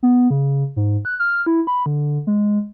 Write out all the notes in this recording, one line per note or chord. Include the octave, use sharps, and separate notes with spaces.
B3
C#3
G#2
F#6
F6
E4
B5
D3
G#3